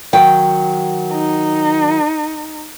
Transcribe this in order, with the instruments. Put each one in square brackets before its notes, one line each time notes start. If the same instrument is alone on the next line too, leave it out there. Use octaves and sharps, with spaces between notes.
[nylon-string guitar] D#3 F#3 G5
[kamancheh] D#4